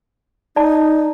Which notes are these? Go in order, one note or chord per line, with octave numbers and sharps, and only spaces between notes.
D#4 D5 A5